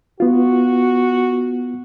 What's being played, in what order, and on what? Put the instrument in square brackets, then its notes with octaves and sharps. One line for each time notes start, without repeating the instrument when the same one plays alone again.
[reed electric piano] B3 F4 [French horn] F#4